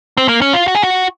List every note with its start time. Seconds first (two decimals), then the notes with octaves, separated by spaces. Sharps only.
0.17 C4
0.29 A#3
0.41 C#4
0.53 F4
0.68 F#4
0.75 G#4
0.83 F#4